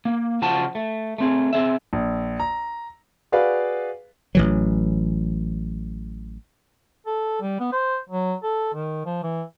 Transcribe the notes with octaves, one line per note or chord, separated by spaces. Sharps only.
A#3
C#3 F3 F#4 A5
A3
A3 C4 G#4
C4 G#4 E5
A#1
A#5
F#4 G#4 B4 D5 F5
A1 E3 F#3
A4
G3
B3
C5
F#3
A4
D#3
F3
E3